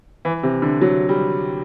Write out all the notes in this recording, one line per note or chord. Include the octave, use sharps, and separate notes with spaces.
E3
C3
D3
F#3
G3